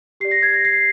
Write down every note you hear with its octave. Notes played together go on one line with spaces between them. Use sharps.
G4 D5 C7
A#6
G#6
A#6
C7